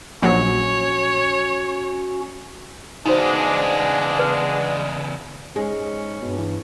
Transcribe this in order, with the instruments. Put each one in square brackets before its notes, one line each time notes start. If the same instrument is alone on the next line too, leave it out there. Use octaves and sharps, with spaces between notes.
[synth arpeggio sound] A#1 F#3 [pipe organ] C#4 F#4 [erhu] C#5
[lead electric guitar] E2 C#3 [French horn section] G#3 B3 D4 [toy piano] D#4 F#4 C5
[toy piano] B4 D5
[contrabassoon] G#2 [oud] G#3 [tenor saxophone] C#4
[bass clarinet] G2 [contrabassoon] B2
[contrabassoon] E3